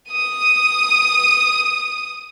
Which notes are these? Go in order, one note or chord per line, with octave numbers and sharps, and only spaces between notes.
D#6 D#7